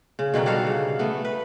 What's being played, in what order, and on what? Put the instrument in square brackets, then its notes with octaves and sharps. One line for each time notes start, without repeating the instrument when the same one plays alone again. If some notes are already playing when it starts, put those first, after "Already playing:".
[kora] C#3
B2 D3 D#3 F#3
G3 F#4 A4 F5
C#3
A3 B3
B4